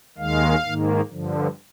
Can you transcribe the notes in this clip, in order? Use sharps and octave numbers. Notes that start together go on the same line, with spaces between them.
D#2 D#3 G#3 F5
G#2 D#3 A#3
G2 D3 F3